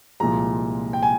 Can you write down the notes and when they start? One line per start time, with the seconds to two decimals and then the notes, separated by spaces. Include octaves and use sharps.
0.20 C2 A#2 F3 G#3 A#5
0.93 G5
1.03 G#5